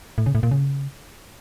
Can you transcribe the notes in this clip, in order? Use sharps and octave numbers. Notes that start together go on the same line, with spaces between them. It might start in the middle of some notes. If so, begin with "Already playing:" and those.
A2
C#3
A2
A#2
C#3